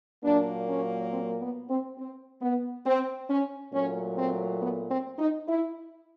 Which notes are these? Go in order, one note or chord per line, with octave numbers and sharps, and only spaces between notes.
A#2 F#3 A#3 D4
C#4
C4
B3
C4
C4
B3
C4
C#4
A#2 F#3 A3 C#4
C4
B3
C4
D#4
E4